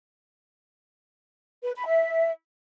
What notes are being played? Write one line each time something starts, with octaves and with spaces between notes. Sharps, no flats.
B4
B5
E5